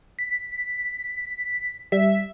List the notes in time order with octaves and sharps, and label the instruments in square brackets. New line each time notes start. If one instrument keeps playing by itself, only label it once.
[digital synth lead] B6
[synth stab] G3 [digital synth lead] E5